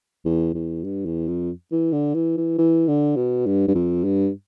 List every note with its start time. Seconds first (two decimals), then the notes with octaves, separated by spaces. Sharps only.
0.25 E2
0.54 E2
0.84 G2
1.05 E2
1.28 F2
1.72 E3
1.93 D3
2.14 E3
2.37 E3
2.58 E3
2.88 D3
3.16 B2
3.46 G2
3.68 G2
3.75 F2
4.04 G2